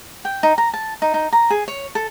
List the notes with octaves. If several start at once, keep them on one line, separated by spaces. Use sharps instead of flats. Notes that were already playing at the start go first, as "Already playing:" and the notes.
G5
D#4
A#5
A5
D#4
D#4
A#5
G#4
C#5
A4